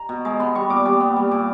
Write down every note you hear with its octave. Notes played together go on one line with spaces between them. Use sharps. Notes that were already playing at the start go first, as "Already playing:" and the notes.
Already playing: A#5
B2
G#3
B3 C6
G3 C#6
A#2 D6
G3 D6
B3
G3
A#2 D6